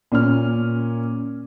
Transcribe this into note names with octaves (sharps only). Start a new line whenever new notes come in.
A#2 C#4 F6